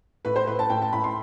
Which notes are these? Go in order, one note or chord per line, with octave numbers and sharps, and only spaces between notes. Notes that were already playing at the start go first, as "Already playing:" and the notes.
A2 B4
C5
A2 B4
A5
A2 G5
A5
A2 B5
C6